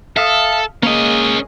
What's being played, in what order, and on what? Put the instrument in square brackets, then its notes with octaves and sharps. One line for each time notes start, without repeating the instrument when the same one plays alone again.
[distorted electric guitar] A4 [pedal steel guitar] E5 F5 D#6
[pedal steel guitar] G#3 A#3 [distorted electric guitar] C#4 D#5